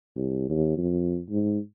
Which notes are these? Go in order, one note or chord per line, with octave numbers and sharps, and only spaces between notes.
C2
D#2
F2
G#2